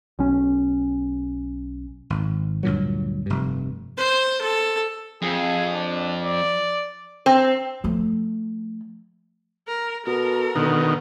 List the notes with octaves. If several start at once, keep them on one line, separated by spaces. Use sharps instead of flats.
B1 C#4
G#1
D2 G2 A#2 F#3
F1 G2
C5
A4
F2 G#4
D4
D5
C4
F3 A3
A#4
B2 A4 A#4
B2 D3 D#3